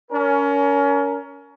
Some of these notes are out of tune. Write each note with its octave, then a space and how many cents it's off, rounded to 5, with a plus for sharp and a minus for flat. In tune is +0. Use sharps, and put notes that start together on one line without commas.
C#4 +25 A#4 +0